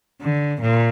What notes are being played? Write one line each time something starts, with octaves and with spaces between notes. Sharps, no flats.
D3
A#2